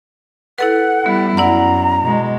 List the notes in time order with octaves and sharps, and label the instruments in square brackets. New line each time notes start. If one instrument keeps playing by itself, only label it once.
[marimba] E4 A4 B4 [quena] F#5
[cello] G3 E4 [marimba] B3
[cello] F#2 [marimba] E4 D5 F#5 [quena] A#5
[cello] B2 G#3